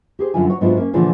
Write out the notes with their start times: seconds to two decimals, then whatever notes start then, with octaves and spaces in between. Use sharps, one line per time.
0.19 G4 G#4 C5
0.34 F#2 D3 F#3 E4 F4 G#5
0.47 F#3 C#5
0.61 G#2 F#3 B3 D4 E4 F4
0.77 A#3 C#4
0.93 A#2 D3 E3 F3 A3 G#4